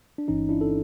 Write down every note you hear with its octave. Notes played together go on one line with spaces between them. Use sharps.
D4
G1 G2 E3 C#4 D#4
D4 E4
A4